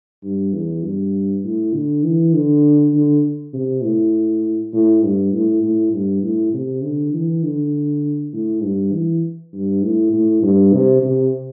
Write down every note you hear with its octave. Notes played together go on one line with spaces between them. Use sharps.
G2
E2
G2
A2
D3
E3
D3
D3
C3
A2
A2
G2
A2
A2
G2
A2
C3
D3
E3
D3
A2
G2
E3
G2
A2
A2
G2
C3
C3